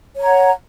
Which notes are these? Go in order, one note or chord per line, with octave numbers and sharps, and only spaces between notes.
C#5 F#5 A#5